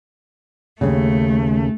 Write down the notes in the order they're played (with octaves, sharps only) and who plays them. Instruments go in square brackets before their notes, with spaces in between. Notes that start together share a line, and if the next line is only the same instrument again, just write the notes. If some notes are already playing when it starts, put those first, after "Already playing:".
[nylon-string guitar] D#2 G#2 C#3 [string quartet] A3